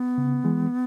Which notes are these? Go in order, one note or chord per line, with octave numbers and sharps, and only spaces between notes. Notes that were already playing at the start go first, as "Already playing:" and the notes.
Already playing: B3
C#3
E3 G#3